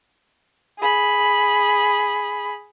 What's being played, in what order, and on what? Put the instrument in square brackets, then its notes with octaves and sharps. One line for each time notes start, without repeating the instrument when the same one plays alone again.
[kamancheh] G#4 B5